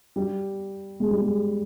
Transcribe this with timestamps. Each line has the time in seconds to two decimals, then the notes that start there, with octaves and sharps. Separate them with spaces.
0.16 G3
1.00 G#3
1.11 G3
1.21 G#3